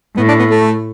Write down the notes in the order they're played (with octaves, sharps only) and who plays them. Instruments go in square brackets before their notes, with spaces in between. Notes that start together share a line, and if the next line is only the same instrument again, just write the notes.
[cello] A2 [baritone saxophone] B3
[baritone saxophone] D4
B3
A3